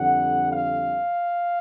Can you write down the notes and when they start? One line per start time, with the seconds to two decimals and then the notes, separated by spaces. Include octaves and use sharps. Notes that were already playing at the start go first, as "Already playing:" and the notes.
Already playing: F2 D3 G3 F#5
0.53 F5